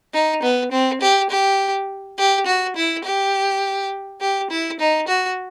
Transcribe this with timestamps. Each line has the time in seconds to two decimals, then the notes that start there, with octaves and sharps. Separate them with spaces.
0.13 D#4
0.43 B3
0.72 C4
1.01 G4
1.30 G4
2.18 G4
2.46 F#4
2.76 E4
3.04 G4
4.21 G4
4.50 E4
4.80 D#4
5.08 F#4